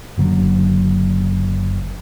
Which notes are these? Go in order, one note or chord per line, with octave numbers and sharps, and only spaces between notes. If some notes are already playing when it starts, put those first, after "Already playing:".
F#1 D3 F#3